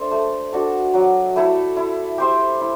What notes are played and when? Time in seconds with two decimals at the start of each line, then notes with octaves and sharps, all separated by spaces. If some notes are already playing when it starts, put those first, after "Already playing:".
Already playing: D4 A4 C5 E5
0.11 A3
0.53 D4 F#4 A4
0.94 F#3
1.36 A3 E4 A4
1.76 E4
2.18 G4 C5 E5
2.61 E4